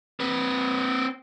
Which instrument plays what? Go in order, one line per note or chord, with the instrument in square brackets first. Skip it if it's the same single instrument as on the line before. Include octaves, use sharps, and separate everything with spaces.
[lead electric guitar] C4 B4